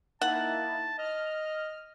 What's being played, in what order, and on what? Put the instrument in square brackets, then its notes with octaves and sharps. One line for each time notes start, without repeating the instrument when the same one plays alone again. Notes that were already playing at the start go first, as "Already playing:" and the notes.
[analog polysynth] A#3 D#4 E4 [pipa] F#5 [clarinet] A5
[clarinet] D#5 [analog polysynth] F6